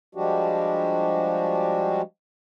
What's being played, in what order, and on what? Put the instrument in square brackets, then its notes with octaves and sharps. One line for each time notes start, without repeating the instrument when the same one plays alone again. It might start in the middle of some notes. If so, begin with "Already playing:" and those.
[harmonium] F3 G3 G#3 D4 F#4 G4